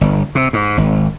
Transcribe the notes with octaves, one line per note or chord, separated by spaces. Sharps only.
G1
C3
G#2
G#1